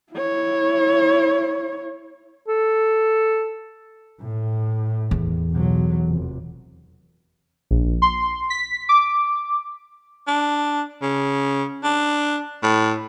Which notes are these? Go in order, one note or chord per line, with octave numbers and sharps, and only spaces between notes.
E4 C#5
A4
A2
E2
B1 F#3
F1
A#1
C6
B6
D6
D4
C#3
D4
A2